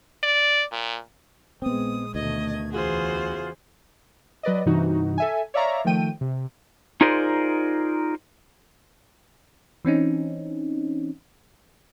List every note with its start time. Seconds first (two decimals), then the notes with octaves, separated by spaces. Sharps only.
0.23 D5
0.72 A#2
1.62 A#1 G#3 B3 C4 D#6
2.15 D2 B2 D#3 A3 D#5 G#6
2.71 E2 C#3 E3 F4 F#4 G#4 C5
4.43 F#3 B4 D5 D#5
4.66 G2 C3 E3 D#4 F#4
5.18 A4 E5 G#5
5.54 C#5 D5 E5 F5 A#5 C#6
5.85 D#3 F3 A3 G5 D#7
6.21 C3
7.01 D#4 F4 G#4 A#4 C5 D5
9.85 E3 C4 C#4 D#4